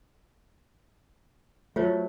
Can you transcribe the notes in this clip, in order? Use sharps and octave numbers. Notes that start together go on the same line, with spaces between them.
F#3 A3 F4 C5 C#5